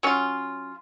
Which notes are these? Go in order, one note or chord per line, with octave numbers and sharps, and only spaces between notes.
F#3 C#4 F4